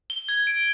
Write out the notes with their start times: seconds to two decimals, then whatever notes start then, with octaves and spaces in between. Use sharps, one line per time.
0.10 G7
0.29 G#6
0.47 D7